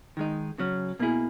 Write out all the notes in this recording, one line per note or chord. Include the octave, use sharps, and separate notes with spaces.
D#3 G#3 D#4
C#3 F#3 C#4
B2 A#3 E4 G#4